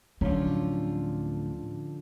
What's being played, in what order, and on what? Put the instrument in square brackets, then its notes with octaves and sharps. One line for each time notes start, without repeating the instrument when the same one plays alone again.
[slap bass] D1 F#3 [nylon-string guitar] D3 F3 C#4 [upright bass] D4